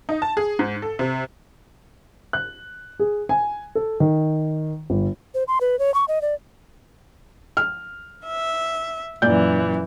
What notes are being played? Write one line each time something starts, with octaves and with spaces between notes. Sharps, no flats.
D#4
A5
G#4
G#2
A4
C3
F#6
G#4
G#5
A4
D#3
G1
C5
C6
B4
C#5
C#6
D#5
D5
F6
E5
F#2 A#2 E3 D5 G6